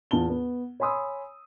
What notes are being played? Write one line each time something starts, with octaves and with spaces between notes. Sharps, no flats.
E2 F4 A5 G7
B3
C#5 G#5 B5 C6 D#6 E6